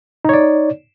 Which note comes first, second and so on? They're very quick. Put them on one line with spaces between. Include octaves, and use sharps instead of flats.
D#4 C#5 D5